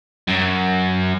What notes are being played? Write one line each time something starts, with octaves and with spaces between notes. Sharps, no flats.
F#2